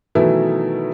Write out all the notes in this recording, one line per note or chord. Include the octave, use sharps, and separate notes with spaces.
B2 D#3 E3 F#3 A3 E4